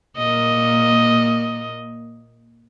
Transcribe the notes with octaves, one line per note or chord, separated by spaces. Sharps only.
A#2 A#3 D#5